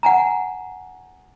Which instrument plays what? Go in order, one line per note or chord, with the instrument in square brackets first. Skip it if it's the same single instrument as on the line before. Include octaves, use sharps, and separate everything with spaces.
[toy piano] F#5 G#5 A#5